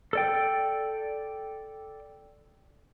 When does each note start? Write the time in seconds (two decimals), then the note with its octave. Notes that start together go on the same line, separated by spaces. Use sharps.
0.13 A4 D5 G5